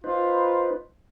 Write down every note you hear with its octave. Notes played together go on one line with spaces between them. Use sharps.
D#4 F4 B4 C5